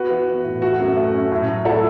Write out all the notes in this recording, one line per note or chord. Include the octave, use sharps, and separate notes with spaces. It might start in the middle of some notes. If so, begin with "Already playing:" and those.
Already playing: B3 F#4 B4
E3
B3
A2
A3 F#4
F#2
A3
C#4
A2
F#3
A3 E4 A4